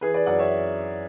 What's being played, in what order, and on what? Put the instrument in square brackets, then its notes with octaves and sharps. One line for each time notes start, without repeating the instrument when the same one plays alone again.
[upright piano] E3 G#4 B4
B4 D5
F#2 D5 F#5
C#5 E5